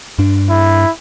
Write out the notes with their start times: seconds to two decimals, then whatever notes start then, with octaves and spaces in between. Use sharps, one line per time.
0.19 G2 D4
0.50 E4